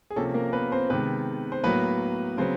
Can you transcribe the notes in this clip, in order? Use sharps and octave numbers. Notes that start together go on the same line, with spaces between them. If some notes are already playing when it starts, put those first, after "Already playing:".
G#4
C3 F3 A#3 C#4 A4
A#3 A#4
B3 B4
C4 C5
C3 D#3 G#3 B3 B4
C5
A2 F#3 A#3 B3 B4
C#3 F#3 B3 C4 C5